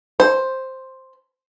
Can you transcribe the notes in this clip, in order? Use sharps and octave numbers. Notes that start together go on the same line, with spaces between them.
C5